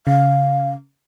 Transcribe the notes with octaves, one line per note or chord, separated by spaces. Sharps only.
C#3 F5